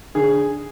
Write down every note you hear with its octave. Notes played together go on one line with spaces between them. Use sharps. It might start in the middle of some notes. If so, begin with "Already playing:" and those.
D3 G#4